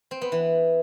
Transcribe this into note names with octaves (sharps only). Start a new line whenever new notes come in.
C4
B3
E3